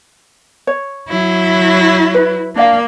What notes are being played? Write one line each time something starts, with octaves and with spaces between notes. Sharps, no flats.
C#5
F#3 E4
B4
A#3 D4 D5 F5